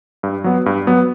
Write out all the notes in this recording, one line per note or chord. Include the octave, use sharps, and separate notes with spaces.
G2
F#3 B3
G2
F#3 B3